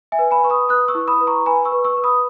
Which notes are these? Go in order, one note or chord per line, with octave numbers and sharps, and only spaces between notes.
E5 G#5
B4
G#5 B5
B4 C#6
B5 D#6
B4 D#6 F#6
C#6 E6
E4
B5 D#6
B4
A#5 C#6
B4 G#5 B5
C#6 E6
B4
C#6 E6
B4
B5 D#6